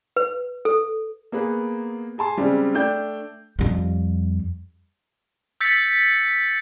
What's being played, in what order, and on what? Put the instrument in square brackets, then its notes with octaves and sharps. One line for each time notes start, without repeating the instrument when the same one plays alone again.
[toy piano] B4
A4
[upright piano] A#3 B3 G#4 B4
G#4 G#5 A5 C6
C#3 G3 G#3 C4 D4
A3 D4 G5 G6
[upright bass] F2 G3
[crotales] E6 G6 A6 B6 C#7